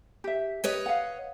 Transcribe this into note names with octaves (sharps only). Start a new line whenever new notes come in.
G4 E5
G4 B4 C#5 D#5
F5 F#5